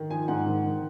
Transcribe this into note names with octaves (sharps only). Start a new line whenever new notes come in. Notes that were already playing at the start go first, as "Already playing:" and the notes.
Already playing: D#3
F3 G#5
G#2 F#5
D#3
D#3